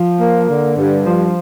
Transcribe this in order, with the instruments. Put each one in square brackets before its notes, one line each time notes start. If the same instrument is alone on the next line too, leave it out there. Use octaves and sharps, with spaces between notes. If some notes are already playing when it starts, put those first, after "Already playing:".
Already playing: [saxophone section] F3
A#3
D3
G2
F3